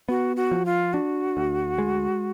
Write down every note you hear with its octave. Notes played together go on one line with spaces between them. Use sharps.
B3 F#4
F#4
F3
F4
D4 F#4
D2
G#3